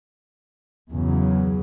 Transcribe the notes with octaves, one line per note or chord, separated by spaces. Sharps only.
E2 C#3 F#3